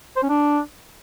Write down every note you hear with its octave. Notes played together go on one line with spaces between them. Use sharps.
C5
C#4
D4